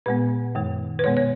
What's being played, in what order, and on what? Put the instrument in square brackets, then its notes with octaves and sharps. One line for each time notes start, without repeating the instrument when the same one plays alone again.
[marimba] A#2 G#3 B3 B4
F#2 D#3 G#3
B4
B2 G#3 B3 C#5
C#5